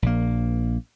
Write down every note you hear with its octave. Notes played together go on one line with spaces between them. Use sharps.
A#1 A#3